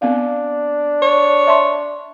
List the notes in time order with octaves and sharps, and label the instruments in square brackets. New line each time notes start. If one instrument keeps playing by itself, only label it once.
[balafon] B3 C4 F5 [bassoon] D4
[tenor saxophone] C#5
[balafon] E5 A5 C6